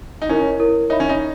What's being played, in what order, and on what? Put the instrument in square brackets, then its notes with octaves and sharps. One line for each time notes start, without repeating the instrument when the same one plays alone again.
[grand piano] D#4
[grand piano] C#4 [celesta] E4 A#4 C#5
[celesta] E4 A#4 C#5
[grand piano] D#4 [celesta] C#5 E5 B5
[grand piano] C#4
D#4